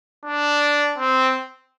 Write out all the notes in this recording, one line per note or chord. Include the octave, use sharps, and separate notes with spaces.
D4
C4